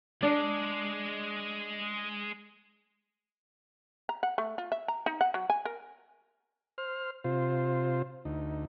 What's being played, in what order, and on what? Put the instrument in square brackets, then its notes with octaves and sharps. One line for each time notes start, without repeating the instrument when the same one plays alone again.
[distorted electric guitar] G#3 [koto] D4
[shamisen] A#5
F#5
A3
F4
E5
A#5
D#4
F#5
F#3
G#5
A#4
[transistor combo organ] C5 F6
C3 F4 C5
D2 D#4